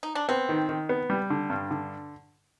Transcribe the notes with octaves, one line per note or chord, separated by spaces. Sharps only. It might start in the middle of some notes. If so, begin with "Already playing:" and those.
D#4
D4
B3 C4
D#3
D#3
B3
G3
D3
G2
D3